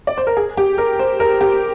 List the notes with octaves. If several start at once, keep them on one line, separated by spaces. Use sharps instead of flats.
D5
C5
A#4
G#4
G4
A#4
C5
A#4
G4